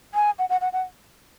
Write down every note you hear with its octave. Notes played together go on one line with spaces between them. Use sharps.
G#5
F#5
F#5
F#5
F#5